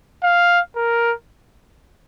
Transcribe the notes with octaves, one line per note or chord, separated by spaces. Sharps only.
F5
A#4